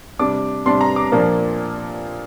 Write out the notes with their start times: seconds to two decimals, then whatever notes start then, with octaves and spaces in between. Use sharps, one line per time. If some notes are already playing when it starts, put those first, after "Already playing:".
0.19 C3 G3 D4 D6
0.66 C3 G3 D4 C6
0.81 A#5
0.96 D6
1.12 A#2 F3 A#3 D4